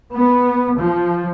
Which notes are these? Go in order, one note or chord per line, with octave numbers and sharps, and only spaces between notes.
B3
F3